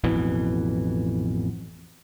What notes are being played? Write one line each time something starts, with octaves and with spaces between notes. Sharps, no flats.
A1 F2 B2 E3